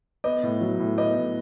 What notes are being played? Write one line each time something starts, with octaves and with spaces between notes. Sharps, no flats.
B3 D#5
A2
F#3
A2
B3 D#5
A2